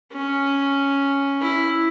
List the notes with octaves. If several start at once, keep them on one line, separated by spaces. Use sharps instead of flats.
C#4
E4